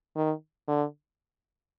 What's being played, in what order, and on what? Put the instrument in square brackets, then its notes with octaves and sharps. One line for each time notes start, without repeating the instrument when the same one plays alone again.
[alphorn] D#3
D3